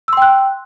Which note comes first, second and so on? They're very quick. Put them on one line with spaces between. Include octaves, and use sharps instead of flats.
E6 C6 G5 F#6